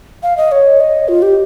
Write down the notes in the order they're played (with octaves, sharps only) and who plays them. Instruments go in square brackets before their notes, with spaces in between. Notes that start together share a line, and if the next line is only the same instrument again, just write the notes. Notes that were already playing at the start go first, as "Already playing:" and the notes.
[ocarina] F5
D#5
C#5
D#5
F4
G4